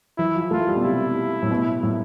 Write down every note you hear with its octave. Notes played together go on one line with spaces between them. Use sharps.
E3 E4
F3
A3 F4
G3
B2
C3 E4
A2
B2
A2